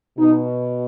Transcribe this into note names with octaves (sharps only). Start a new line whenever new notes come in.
B2 D#4